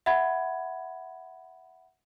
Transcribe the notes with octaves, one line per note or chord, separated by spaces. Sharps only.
E5 F#5 B5 G#6